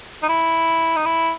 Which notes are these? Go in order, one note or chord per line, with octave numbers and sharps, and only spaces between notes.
D#4
E4
D#4
E4